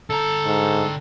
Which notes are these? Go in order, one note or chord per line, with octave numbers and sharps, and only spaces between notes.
D3 A4 A#5
G#2